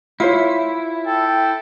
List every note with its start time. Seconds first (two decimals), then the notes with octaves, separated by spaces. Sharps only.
0.20 E4 F4 C5 C#5
1.07 A4 G5